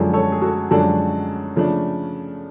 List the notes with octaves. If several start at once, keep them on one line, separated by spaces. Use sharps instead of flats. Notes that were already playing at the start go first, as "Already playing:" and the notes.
Already playing: F#2 D3 F3 G#3 D4
A4 C#5
G#4
F#4 A4
F#2 D3 F3 G#3 D4 F#4 A4
C#3 F3 A3 D4